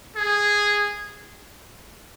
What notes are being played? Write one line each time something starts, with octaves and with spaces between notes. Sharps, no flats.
G#4